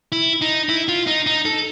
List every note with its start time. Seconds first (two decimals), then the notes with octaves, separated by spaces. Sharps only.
0.12 E4
0.41 D#4
0.69 E4
0.88 F4
1.07 D#4
1.27 D#4
1.45 A4